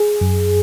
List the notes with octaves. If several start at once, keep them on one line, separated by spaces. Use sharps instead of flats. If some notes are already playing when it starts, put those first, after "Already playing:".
Already playing: G#4
F#2